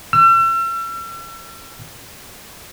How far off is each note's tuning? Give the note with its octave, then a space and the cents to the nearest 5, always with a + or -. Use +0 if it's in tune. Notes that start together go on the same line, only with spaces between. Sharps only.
E6 +40